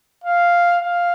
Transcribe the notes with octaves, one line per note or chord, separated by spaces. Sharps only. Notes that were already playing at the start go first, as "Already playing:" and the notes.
F5
F5